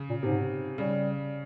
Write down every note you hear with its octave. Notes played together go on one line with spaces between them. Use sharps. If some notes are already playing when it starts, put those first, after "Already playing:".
Already playing: C#3
A#2
G#2 C3
C#3 G3